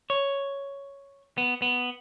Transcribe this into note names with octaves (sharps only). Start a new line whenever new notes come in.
C#5
B3
B3